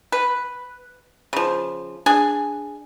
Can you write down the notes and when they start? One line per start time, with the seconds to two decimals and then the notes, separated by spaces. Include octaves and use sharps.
0.12 B4
1.33 C#3 F3
2.06 D4 G#4 G#5